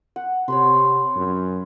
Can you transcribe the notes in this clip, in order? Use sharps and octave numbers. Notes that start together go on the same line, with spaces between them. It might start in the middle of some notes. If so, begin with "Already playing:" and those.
F#5
C3 C#5 B5 C6
F#2